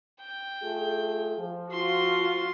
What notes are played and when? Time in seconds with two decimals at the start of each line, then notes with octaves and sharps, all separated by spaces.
0.20 G5
0.63 A3 F4 G#4
1.39 F3
1.72 F4 F#4 C6